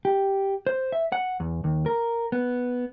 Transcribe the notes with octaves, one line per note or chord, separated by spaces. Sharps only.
G4
C5
E5
F#5
E2
D#2
A#4
B3